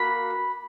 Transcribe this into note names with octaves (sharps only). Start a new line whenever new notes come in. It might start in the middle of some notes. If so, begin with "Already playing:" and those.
Already playing: A#3 F#4 B5